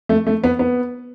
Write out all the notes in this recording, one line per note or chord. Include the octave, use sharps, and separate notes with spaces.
A3
A3
B3
B3